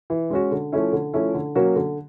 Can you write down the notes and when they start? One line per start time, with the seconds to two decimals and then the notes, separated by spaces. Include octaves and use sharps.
0.10 E3
0.30 G#3 C#4 F#4
0.51 D3
0.72 F3 A3 C#4 E4
0.93 D3
1.14 F3 A3 C#4 E4
1.34 D3
1.55 F#3 A#3 C#4 F#4
1.76 D3